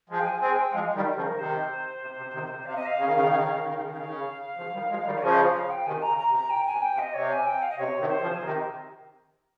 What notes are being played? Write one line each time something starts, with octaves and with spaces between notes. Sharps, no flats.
F3 G#3
G5
G#5
G#3 C4 G#5
G5
F3 G#3 F5
F5
D#3 G3
C#3 F3 G#4
A#4
C3 D#3 C5
C3
C3
C3 D#3
C3
C3 F5
D#5
F5
C#3
D#3
C#3
D#3
C#3
D#3
C#3
D#3
C#3
D#3
C#3
D#3
C#3
D#3 F5
C#3
C#3 F3
D#3 G3
F3 G#3
D#3 G3
C#5
C#3 F3 D#5
F5
F5
G5
C3 D#3 G#5
A#5
C#3
A#5
C3
A#5
A#2 G5
G#5
C3
G5
C3
D#5
C3 C#5
G#5
G5
F5
D#5
C3 C#5
C3 D#3
C5
C#3 F3
G#4
C3 D#3 A#4